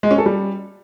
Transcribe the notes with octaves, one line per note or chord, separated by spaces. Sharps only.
G#3
C#4
A4
G3